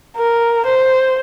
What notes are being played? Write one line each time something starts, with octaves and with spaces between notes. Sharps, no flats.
A#4
C5